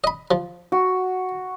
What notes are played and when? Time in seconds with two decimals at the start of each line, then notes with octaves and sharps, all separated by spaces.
0.04 D#5 B5
0.31 F3
0.72 F#4